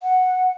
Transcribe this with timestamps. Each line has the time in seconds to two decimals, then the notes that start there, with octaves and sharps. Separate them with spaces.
0.01 F#5